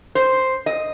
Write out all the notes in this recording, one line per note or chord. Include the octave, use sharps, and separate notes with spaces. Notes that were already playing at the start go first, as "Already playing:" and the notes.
C5
D#5